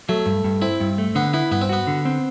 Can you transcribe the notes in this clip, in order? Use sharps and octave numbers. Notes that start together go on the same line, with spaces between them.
F#3 A3
G2
G2
C4 E4
G2
A3
D3 B3
B3 E4
G2 B3
C4
B3 F#4
D3
C4